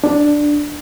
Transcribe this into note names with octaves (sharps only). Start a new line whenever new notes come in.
D4